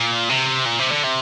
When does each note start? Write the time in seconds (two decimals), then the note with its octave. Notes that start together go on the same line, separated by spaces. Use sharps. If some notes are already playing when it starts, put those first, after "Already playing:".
Already playing: A#2
0.29 C3
0.66 A#2
0.79 C3
0.92 D3
1.04 C3